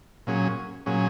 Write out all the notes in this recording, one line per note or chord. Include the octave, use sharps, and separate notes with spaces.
A#2 F#3 C#4 G#4
A#2 F#3 C#4 G#4